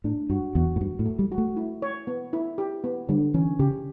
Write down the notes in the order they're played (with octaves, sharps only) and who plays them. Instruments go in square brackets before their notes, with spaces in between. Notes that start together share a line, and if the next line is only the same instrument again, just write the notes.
[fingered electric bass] A2 [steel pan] D4
[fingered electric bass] G2 [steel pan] F#4
[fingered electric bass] E2 [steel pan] F#4
[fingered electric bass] A2
[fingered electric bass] G2 [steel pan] F#4
[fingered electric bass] A2
[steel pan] A3
[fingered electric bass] G3
[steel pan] F#4
[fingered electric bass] A3
[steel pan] E4
C#5
B3
E4
G4
B3
[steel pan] D3 [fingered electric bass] G3
[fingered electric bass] E3 [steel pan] C#4
[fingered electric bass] C#3 [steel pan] G4